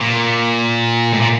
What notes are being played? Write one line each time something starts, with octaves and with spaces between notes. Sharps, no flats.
A#2
A2
A#2